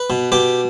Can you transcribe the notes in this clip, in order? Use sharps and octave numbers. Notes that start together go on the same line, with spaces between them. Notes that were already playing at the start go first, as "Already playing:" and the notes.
Already playing: B4
B2
B2 G4